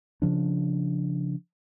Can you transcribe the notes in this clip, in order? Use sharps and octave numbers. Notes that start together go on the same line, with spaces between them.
C#3 F3 D4